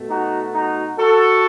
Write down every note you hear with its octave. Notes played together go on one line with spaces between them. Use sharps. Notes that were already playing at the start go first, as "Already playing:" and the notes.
Already playing: B2 A3
D#4 F#4
D#4 F#4
F#4 A4